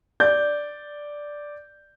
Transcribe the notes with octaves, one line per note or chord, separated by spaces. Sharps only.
D5 G6